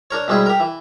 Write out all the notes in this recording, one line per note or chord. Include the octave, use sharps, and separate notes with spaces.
D4 A#4 C#5
B2 G3 G#3 C4 E4 G#4
G4 A#4
E3